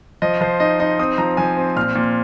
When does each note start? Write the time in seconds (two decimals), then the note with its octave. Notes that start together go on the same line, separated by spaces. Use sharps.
0.22 F3 D#5
0.41 F3 C5
0.60 D#4 D#5
0.80 D#4 D#5
0.99 C4 D#6
1.18 F3 A#5
1.37 F3 G#5
1.57 C4
1.76 A#2 F6
1.95 A#2